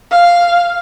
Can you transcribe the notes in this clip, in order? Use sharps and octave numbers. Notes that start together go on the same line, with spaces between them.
F5